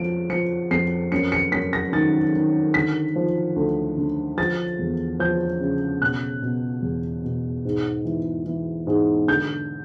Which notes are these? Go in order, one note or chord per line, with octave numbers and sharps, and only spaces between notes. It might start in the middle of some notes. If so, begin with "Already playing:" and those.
Already playing: F2 F3 D7
F3 C#7
F2 C7
F#2 C#7
C#7
F#2 B6
A#6
D#3 A6
D#3
D3 B6
F3
D2
D3
F3 A6
E2
F3 G6
C#3
B2 F#6
B2
E2
B2
G#2
E3
E3
G#2
D3 G6